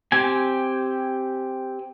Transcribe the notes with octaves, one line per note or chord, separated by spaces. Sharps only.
C4 G4 G#5